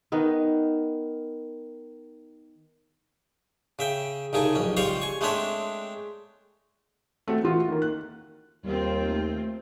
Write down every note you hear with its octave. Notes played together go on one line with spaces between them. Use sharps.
D#3 B3 D#4
C#3 E5 G5
C2 C#3 D#4 A4 G#5
B1 F2 C#4
C#2 G3 F4 C5 F5 C#6
G#5 C#6
G#3 A3 C4 D4 C#5 E5
A3 C4 F#4 A4
E3 F4 F#4
D#3 A#3
F#6
D#2 G3 C4 F4
A3